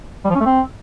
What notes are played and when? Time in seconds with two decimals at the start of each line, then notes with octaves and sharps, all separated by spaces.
0.25 G3
0.30 F3
0.35 C#4
0.40 A3
0.46 C4